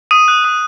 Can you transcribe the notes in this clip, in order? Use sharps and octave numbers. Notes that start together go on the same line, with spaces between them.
D#6 D#7
F#6
D#6